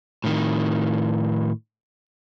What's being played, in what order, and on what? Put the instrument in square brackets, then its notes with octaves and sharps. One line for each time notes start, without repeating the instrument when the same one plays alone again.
[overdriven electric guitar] A2 D#3